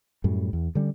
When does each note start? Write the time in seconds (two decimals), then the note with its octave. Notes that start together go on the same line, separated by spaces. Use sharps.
0.24 F#2 A2 G3
0.53 E2
0.75 D3 G3 C#4